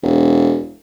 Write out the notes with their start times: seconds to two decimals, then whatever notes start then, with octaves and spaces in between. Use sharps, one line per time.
0.03 E1